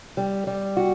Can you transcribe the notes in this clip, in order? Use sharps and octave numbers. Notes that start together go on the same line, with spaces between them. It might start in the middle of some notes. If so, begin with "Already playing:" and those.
G3
G3
F#4